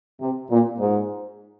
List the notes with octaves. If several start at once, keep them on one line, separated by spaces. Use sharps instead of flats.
C3
A#2
G#2